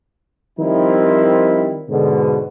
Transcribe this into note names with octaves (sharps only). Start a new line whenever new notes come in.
D#3 F3 G3 C4 D#4 E4
G#2 B2 D3